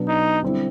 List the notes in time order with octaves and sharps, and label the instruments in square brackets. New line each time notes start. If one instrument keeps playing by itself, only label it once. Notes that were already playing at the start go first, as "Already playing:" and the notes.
Already playing: [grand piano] B2 F#3 B3 D4
[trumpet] D#4
[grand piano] D3 G3 C4 E4